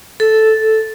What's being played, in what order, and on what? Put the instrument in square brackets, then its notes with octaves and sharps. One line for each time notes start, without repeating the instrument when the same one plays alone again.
[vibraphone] A4